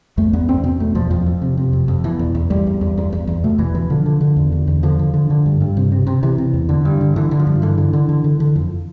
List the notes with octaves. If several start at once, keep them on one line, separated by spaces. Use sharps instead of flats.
E2 A3
E2 B3
E2 C4
B2 C4
E2 A3
E2 F3
F2 F3
F2
C3
C3
F2
F2
B2 E3
E2
E2
E2 G3
E2
E2
E2
E2
E2
B2 A3
E2 E3
B2 E3
D3 F3
D3
D3
E2
D3
E2
D3 F3
D3
D3
D3
G2
G2
C3
C3
C3
C3 E3
C3
E2
D3
G2
D3
D3 E3
D3
F3
G2
D3 E3
D3
D3
D3
D3
D3
F2